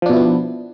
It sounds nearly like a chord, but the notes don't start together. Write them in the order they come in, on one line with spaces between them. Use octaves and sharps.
F3 D4 B2 E4 B3